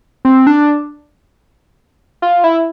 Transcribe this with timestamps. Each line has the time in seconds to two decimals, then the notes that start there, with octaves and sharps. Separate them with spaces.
0.25 C4
0.47 D4
2.22 F4
2.44 E4